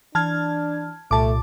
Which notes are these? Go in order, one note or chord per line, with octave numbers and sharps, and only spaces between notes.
E3 D4 A5 F6 G#6
C2 A#2 A3 A5 D6